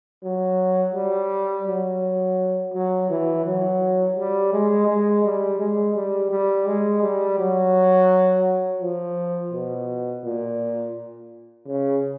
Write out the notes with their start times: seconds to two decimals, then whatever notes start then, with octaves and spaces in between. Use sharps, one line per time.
0.23 F#3
0.95 G3
1.67 F#3
2.74 F#3
3.10 E3
3.45 F#3
4.17 G3
4.53 G#3
4.88 G#3
5.24 G3
5.59 G#3
5.95 G3
6.31 G3
6.66 G#3
7.02 G3
7.39 F#3
8.81 F3
9.52 B2
10.23 A#2
11.67 C#3